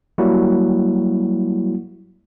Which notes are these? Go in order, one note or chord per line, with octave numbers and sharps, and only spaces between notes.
F#3 G3 A#3 E4 F#4